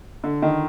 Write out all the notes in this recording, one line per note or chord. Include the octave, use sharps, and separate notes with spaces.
D3
D#3